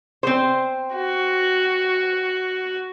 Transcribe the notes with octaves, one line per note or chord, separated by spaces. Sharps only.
C4 C5
F#4